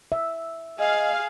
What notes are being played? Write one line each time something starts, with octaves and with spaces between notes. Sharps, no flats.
E5
G#4 D#5 F5